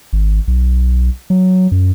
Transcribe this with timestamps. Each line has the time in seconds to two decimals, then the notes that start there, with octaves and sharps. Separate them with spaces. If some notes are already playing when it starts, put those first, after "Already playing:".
0.13 G#1
0.47 B1
1.30 F#3
1.72 F#2